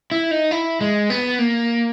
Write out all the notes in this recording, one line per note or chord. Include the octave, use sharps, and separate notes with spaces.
E4
D#4
E4
G#3
B3
A#3